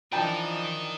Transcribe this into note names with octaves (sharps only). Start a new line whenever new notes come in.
E3 F3 D4 D#4 A#4 G5 A5